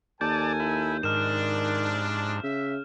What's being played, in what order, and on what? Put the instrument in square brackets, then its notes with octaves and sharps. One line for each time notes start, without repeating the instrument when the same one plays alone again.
[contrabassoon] D#2 [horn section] A4 A#4 G#5 [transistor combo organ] D5 A5 [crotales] G6
[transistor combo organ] E4
[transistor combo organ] G#2 [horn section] C3 F3 D4 [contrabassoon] D#3 [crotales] F6 G6 E7
[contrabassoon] C#3 [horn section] E5